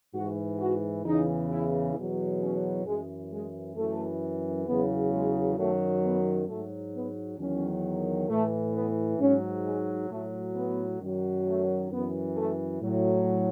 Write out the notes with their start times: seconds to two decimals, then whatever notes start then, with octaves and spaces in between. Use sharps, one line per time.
0.14 G#2 E3 F#4
0.59 F#4
1.05 E2 C#3 E3 D#4
1.50 E4
1.95 E2 B2 F#3
2.41 C#4
2.86 F#2 E3 G#3
3.31 G#3
3.76 F#2 E3 A3
4.67 E2 C#3 F#3 B3
5.12 G#3
5.57 F#2 D#3 F#3 A3
6.03 B3
6.47 G#2 F#3 A3
6.94 B3
7.39 E2 D#3 F#3 C#4
8.29 A2 E3 A3
8.74 B3
9.19 G#2 F#3 C#4
9.64 G#3
10.10 A2 F#3 A3
10.55 B3
11.01 F#2 D#3 F#3
11.46 A3
11.92 F#2 E3 B3
12.37 A3
12.82 A2 F#3